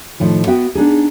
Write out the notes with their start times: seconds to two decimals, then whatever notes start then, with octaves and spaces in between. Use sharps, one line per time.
0.20 A2 D#3 F3
0.47 B3 F#4 E5 G5
0.75 B3 D4 D#4 G#4